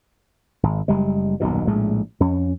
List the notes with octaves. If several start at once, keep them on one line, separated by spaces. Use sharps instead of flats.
G#1
F#1 G3 G#3
D#1 B1 F#2 B2
A#1 A2 G#3 A3
F2 C#4